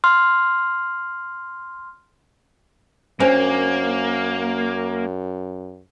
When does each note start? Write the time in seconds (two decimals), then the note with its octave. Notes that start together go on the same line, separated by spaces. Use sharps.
0.04 C6 F6
3.20 F#2 A#3 C#4 D4 C5 G#5